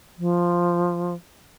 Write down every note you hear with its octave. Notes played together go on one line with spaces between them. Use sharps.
F3